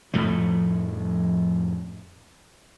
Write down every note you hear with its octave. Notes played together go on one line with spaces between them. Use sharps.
F2 A2 F3 A3